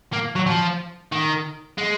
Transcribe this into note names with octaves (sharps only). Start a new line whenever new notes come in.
A#3
F#3
F3
D#3
G#3